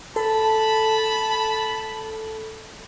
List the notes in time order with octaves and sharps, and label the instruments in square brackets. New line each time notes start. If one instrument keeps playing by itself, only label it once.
[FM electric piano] A4 [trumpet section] A5 B5